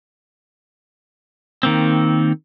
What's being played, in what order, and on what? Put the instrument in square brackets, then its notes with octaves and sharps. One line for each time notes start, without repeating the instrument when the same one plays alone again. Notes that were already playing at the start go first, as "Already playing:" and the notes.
[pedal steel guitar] D#3 A#3 C4